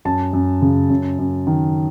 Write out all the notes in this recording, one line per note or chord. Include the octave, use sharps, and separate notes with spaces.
F#2 A5
F#2
C#3
F#2
F#2
D#3